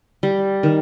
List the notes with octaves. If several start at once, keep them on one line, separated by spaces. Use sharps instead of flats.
G3
D#3